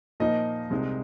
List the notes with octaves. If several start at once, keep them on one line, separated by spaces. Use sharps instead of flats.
A#2 F3 A#3 D#4 D#5
C2 C3 G#3 D#4